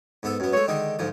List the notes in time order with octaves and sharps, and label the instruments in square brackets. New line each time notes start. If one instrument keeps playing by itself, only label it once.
[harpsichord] G#2 B3 A4
F#2 B3
[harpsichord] G#3 A3 [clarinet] C#5
[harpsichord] D3 D#3 G#3 [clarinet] D#5
[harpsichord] D2 G#2 F3